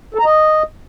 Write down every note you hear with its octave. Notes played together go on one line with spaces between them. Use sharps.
A4
A#5
D#5